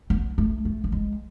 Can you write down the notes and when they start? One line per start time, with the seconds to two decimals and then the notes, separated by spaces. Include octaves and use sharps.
0.10 B3
0.38 A3
0.65 A3
0.84 A3
0.92 G#3